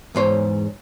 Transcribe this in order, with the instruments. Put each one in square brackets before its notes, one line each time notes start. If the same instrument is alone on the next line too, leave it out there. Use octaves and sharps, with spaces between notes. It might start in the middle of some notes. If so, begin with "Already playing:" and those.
[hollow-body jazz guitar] E2 G#2 C5 C#5